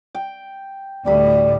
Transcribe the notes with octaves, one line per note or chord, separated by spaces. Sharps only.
G5
D2 A2 G3 D5 B5